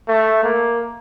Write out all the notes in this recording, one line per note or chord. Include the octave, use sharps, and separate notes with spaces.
A3
A#3